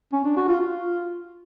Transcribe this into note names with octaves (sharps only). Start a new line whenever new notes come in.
C#4
D4
F#4
F4
F4